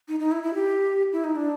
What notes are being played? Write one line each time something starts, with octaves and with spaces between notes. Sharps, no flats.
D#4
D#4
E4
E4
G4
E4
D#4
D4